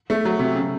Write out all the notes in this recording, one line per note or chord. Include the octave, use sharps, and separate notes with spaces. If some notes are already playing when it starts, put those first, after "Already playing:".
A3
F#3
C3
C#3